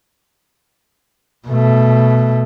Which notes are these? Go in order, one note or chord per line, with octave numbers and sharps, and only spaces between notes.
B2 A3